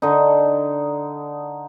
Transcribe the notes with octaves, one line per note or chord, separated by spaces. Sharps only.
D3 D#4